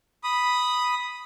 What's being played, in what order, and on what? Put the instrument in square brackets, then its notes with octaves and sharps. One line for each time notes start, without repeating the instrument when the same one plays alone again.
[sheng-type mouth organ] B5 D#6